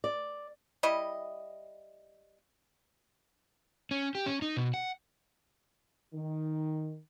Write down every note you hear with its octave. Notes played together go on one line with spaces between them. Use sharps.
D5
G3 E4 D#5
C#4
G4
C#4
D#4
B2
F#5
D#3